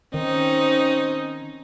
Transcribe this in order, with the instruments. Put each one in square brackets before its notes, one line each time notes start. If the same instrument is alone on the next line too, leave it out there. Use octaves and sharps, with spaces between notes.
[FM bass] D#3 [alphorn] C4 [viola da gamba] C#4 D#4